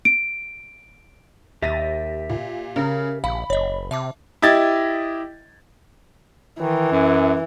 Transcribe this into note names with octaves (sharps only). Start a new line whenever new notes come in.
D7
D#2 G4 E5 A6 A#6 D#7
A#2
C#3 A#4
A#1 F5 B5
F#1 C#5 D#5
C3 E5 A5 D6
E4 G4 D#5 G#6 A6
D#3 E3
F#2